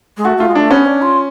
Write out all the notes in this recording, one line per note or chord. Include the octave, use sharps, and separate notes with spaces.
G#3
A3 F#4
A3 F4
G#3
A3 D4
B3 C#4
D4
F4